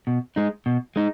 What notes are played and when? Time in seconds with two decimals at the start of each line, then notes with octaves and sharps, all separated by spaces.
0.07 B2
0.36 G#3 D#4
0.66 B2
0.96 G#3 D#4